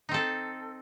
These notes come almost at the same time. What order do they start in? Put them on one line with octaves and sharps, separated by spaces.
D#4 C4 A4